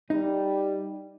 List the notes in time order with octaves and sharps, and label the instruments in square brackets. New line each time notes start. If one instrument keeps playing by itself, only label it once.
[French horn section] G3 [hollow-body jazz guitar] D#4